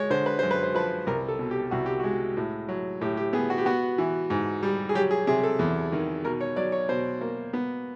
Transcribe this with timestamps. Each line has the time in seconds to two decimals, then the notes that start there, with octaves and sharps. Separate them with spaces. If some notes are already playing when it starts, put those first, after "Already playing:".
Already playing: G#3 C#5
0.10 D3 C5
0.26 B4
0.39 F#2 C5
0.51 B4
0.63 C5
0.74 F3 B4
1.07 C2 A#4
1.28 A4
1.39 B2
1.51 G4
1.71 C2 F#4
1.86 G4
2.00 G#3 F#4
2.37 A2
2.69 F#3
3.01 A2 G4
3.17 G4
3.33 B3 G#4
3.50 F#4
3.58 G4
3.66 B3 F#4
3.98 E3
4.30 G#2
4.63 G3
4.89 G#4
4.95 F#3 G4
5.11 G#4
5.27 C3 G#4
5.43 A4
5.59 E2
5.92 D#3
6.25 B2 A#4
6.41 C#5
6.56 F#3 D5
6.72 C#5
6.89 B2 C5
7.21 A#3
7.53 B3